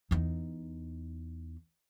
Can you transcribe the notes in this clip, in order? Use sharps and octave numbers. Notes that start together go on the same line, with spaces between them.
E2 D#4